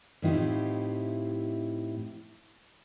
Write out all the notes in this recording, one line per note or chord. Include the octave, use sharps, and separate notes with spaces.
A2 F3 C4 D#4 E4 G4